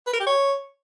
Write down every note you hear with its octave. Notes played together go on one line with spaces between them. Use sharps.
B4
A#4
G4
C#5